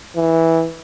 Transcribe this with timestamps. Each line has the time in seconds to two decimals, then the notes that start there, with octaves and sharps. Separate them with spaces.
0.16 E3